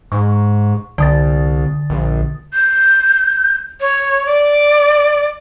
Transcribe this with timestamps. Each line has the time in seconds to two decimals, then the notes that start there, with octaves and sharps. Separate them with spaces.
0.12 G#2 C#6
0.98 C2 D3 D#6 A6
1.90 A#1
2.53 G6
3.81 C#5
4.26 D5